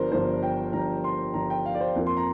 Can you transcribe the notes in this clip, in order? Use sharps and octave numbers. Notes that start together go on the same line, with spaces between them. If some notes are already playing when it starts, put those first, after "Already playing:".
Already playing: G1 G2 F3 D4 A#4 C5
G1 G2 F3 D4 C5
G5
G1 G2 F3 D4 A#5
C6
G1 G2 F3 D4 A#5
G5
F5
D5
C5
F2 F3 A#3
C6
A#5